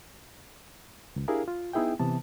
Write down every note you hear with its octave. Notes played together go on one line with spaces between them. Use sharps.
C#2
D4 E4 G4 G#4 A#4 F5
F4
B3 D#4 E4 G#4 E5 G5
C3 E3 B3 A5